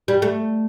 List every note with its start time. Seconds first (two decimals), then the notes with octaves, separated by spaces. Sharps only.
0.08 G3
0.22 A3